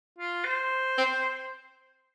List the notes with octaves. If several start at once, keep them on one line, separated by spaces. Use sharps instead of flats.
F4
C5
C4